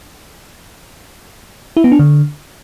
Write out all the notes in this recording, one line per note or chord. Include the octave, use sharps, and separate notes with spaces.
E4
B3
D4
D3